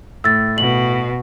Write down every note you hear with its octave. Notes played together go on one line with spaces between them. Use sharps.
A2 E6 A6
B2 F#7